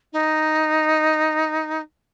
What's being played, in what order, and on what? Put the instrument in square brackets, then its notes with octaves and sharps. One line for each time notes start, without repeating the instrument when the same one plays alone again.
[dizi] D#4